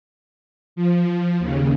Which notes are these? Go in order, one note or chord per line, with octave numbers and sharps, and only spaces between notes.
F3
D#2 C#3